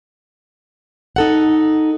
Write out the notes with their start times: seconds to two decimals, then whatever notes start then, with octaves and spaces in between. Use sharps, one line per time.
1.16 D#4 A4 F#5